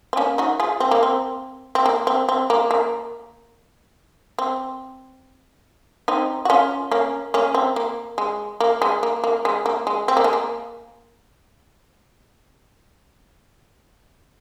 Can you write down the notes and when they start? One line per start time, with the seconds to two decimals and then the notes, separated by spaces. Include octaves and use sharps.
0.13 C4
0.17 A#3 C#4
0.38 D#4 F#4
0.60 F4 G#4
0.80 C4
0.91 A#3
1.03 C4
1.75 C4
1.86 A#3
2.07 C4
2.29 C4
2.50 A#3
2.71 A#3
4.39 C4
6.08 C4 D#4
6.45 F#4
6.50 C#4 F4
6.91 A#3 C#4
7.34 A#3 C#4
7.55 C4
7.76 A#3
8.18 G#3
8.60 A#3
8.82 G#3
9.03 A#3
9.24 A#3
9.45 G#3
9.66 A#3
9.87 G#3
10.08 C4
10.17 A#3
10.24 G#3
10.33 A#3